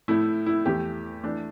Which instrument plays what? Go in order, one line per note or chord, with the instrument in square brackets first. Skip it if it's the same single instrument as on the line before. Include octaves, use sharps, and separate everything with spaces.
[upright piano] A2 A3 E4
E4
E2 E3 A3 G4
E3 A3 D4